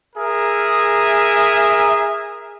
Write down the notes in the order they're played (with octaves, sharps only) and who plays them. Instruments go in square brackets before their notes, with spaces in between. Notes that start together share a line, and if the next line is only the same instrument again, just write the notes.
[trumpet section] G#4 A#4 E5